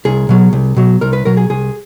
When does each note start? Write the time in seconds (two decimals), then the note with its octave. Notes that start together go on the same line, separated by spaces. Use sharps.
0.05 C2 G#4
0.29 B2 F#3
0.53 C2
0.76 B2 F#3
1.01 C2 A#4
1.13 B4
1.25 B2 F#3 A#4
1.37 G#4
1.50 C2 G#4